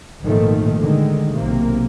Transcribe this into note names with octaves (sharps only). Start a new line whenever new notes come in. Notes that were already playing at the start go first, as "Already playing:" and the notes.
G#1 A#2 D#3 F3 A3
D3 D#3 G#3
B1 C3 A#3